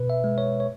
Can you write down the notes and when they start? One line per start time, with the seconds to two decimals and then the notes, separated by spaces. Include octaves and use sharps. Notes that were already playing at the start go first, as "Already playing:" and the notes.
Already playing: B2 B4
0.10 E5
0.24 G#3
0.38 C#5
0.60 C#5